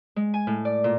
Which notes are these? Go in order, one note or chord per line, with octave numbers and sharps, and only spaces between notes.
G#3
G#5
A2
D5
A#2